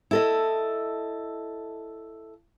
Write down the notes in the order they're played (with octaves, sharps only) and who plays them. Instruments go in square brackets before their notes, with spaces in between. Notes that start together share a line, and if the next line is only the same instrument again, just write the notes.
[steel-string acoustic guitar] E4 A4 D#5